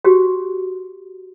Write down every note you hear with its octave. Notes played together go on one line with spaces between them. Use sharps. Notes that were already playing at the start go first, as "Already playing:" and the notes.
F#4 G4